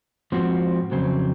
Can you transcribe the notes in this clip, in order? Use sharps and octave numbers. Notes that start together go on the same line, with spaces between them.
G#2 F3 C4 F#4
F2 C#3 F#3 C4